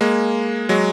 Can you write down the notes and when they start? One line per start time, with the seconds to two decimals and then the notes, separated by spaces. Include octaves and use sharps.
0.01 G#3 A#3
0.69 F#3 G#3